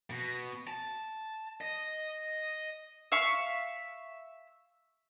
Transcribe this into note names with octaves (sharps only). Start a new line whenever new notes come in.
B2
A5
D#5
E5 F5 C#6